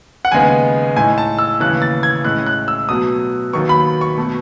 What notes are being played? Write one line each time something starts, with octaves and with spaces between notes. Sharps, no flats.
F#5
D#2 C#3 G#3 B3 D#4 G#5
A2 G#3 D#4 G#5
A5
E6
D#2 C#3 E3 A3 C#4 F#6
A6
G#6
A2 G#3 C#4 E4 F#6
F#6
E6
B2 F#3 A3 D#6
D#2 D#3 F#3 B3 C#6
B5
C#6
B2 A3